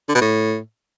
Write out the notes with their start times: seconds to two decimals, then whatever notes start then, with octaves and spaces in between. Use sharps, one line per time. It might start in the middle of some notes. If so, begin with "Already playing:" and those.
0.09 D3
0.15 B2
0.21 A2